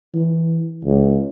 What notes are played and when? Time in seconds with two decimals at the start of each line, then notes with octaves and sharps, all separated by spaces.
0.14 E3
0.85 C#2